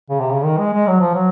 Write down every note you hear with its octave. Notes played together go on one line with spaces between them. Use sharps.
C#3
C3
C#3
D#3
G#3
G#3
F#3
F3
F#3